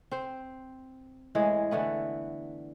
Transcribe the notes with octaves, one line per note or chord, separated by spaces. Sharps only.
C4 C5
A2 E3 G#3 G#4
D3 E3 A3 B3